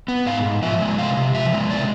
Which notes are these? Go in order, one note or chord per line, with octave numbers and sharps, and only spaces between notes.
B3
G#2 F5
G#2
F3 E5
G#3
C3 F5
C3
F3 E5
G#3
C3 D5